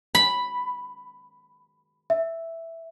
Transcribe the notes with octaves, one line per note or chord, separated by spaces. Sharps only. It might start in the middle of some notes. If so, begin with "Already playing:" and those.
B5
E5